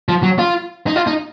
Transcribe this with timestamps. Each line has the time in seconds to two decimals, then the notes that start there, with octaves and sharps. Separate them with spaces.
0.09 F3
0.23 F#3
0.39 F4
0.87 D#4
0.96 F4
1.07 D#4